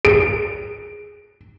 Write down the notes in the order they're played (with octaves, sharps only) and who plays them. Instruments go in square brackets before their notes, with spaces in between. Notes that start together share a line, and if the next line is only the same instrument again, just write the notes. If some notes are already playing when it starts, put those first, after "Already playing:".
[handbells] G#4 [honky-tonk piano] D7